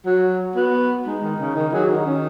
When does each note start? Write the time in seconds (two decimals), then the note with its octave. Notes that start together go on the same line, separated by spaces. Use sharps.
0.06 F#3 F#4
0.55 B3 F#4
1.06 G#3 D#4
1.23 D#3
1.40 C#3
1.55 D#3
1.73 F#3 G#4
1.85 D#3 F#4
1.95 D#4
2.05 C#4